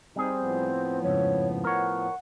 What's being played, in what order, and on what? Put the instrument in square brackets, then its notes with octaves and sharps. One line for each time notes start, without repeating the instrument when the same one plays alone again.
[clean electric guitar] G3 G#4 [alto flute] C4 [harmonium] D#4
[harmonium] A2 F3 B3
[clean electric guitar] F2 G#2 C#3 [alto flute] C#5
[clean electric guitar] A#4 C#5 [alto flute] F#5